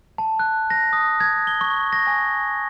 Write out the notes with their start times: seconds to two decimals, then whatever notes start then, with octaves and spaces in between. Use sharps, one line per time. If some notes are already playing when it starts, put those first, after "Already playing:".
0.18 A5
0.39 F#6
0.70 A#6
0.93 D#6
1.20 G#6
1.47 G7
1.61 C#6
1.93 A#6
2.07 G#5